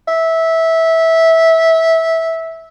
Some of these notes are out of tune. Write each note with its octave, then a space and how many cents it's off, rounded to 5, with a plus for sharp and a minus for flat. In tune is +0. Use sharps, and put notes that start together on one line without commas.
E5 -15